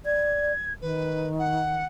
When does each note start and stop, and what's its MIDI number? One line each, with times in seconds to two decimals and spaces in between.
0.06 0.52 74
0.06 0.73 92
0.82 1.83 51
0.82 1.28 71
1.39 1.85 78